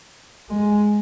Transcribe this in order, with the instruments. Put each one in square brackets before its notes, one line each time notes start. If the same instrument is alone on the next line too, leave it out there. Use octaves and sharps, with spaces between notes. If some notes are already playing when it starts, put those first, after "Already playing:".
[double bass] G#3